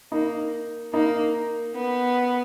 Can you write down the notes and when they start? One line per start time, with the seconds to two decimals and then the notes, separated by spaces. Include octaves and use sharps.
0.12 A#3 D#4
0.93 A#3 D#4
1.75 B3